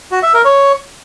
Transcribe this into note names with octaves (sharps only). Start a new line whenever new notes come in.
F#4
E5
A#4
C#5